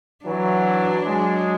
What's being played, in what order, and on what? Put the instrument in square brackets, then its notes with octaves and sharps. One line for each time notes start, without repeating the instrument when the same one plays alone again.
[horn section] E3 F#3 [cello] D4
[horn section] F#3 G#3